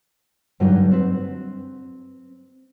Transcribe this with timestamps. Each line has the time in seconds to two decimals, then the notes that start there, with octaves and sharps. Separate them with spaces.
0.60 G2 D3 F#3 D#4
0.92 C4 B4